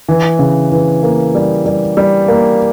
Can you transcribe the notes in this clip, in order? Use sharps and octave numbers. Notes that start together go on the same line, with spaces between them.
E3
C#3
E3
A#3
G3
G3
G3
A#3